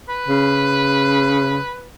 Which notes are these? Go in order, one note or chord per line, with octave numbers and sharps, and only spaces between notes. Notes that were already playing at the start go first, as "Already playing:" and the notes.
B4
C#3